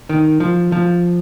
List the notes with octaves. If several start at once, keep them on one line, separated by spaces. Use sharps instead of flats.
D#3
F3
F3